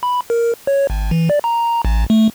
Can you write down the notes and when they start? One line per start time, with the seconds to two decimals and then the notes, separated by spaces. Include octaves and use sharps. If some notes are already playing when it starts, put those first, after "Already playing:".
0.03 B5
0.30 A#4
0.67 C#5
0.90 G#1
1.11 E3
1.30 D5
1.44 A#5
1.85 A1
2.10 A3